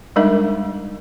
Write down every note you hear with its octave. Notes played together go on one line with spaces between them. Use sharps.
G3 G#3 D4 D#4 A#4 E5